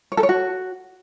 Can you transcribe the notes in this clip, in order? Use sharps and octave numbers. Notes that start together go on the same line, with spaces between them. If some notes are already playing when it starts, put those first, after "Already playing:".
C#5
A4
C#5
F#4